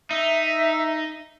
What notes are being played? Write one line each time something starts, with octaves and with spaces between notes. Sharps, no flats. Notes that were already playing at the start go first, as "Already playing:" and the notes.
D#4 E5